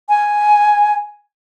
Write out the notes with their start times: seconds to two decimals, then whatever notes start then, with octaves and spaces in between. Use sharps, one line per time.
0.09 G#5